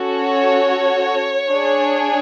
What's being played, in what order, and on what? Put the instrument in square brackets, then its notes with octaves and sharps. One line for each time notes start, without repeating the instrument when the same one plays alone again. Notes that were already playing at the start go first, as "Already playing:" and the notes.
Already playing: [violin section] C#4 F#4 A4
C#5
D4 G#4